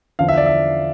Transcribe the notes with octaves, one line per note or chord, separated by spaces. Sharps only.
E2 D3 F3 F5
E5
D5
E5